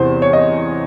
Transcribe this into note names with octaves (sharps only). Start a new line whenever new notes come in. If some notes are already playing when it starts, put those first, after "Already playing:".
Already playing: E2 C3 E3 C5
C#5
D#5